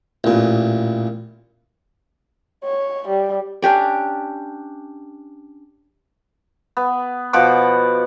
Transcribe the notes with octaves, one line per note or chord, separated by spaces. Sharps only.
A1 A#2
C#5
G3
C#4 D4 G4 D5
B3
B2 F3 F#5 D6